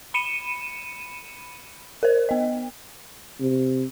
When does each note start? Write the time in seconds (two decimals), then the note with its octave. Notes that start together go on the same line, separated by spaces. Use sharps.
0.14 B5 C#7 D#7 E7
2.03 A#4 C5
2.29 B3 D#5
3.40 C3